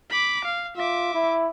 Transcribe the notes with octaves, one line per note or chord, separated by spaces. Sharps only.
B5 D6
F5
F4 E5 D6
E4